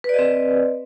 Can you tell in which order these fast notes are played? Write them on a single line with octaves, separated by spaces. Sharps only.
B4 D5 D#5 C4